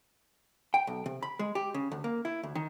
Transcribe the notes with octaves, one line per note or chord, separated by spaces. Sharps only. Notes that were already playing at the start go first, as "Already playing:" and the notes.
G5
B1
C3
B5
G#3
G4
C#3
D2
A#3
E4
D2
D#3